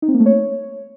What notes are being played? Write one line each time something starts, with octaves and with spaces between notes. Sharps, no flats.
D#4
C4
A#3
A3
C#5